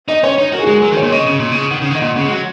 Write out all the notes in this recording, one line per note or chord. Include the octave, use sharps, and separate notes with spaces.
D#4 D#5
C#4 C#5
D#4
F#4 A#4
G#4
F#4
G#3
G#4
F#3 A#4
D#3
C#5
A#2
C#3 D#5
C#3
A#2
C#3
D#3 F#5
C#3
D#3 F#5
D#5
A#2 F#5
C#3 F#5
G#3
F#3 F#5